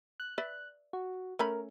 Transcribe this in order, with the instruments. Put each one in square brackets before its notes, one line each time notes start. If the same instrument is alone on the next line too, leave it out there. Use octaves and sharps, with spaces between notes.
[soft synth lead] F#6
[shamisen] B4 D5 E5
[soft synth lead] F#4
[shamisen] A3 C#4 B5 [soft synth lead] A#4